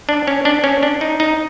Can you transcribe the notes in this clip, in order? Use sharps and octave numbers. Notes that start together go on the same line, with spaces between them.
D4
C#4
D4
C#4
D4
D#4
D#4